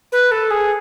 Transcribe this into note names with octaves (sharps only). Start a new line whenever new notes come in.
B4
A4
G#4